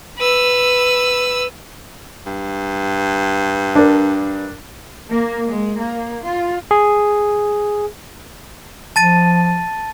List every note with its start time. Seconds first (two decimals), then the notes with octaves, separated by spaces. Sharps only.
0.18 B4 E6
2.26 G2
3.75 D4 A#4
5.11 A#3
5.47 G#3
5.77 A#3
6.24 F4
6.71 G#4
8.96 F3 A5 A6 D#7